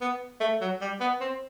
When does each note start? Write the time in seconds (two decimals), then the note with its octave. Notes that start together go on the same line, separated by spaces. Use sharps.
0.01 B3
0.40 A3
0.61 F#3
0.81 G3
1.00 B3
1.21 C4